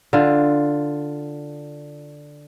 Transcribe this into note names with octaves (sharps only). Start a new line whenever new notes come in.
D3 F4